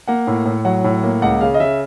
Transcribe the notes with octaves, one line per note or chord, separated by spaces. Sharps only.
A#3 F#5
A2
A2
F#3 F#5
A2
A#3
C#2 F#5
C#3 F5
D#5
C#3 E5